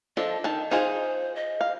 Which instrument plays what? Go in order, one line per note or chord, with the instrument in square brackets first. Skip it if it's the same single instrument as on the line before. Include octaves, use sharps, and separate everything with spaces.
[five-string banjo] F3 D4 A4 [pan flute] D#5
[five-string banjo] D#3 A5
[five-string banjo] D#4 F4 G#4 [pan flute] C5
[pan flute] D#5
[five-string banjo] F5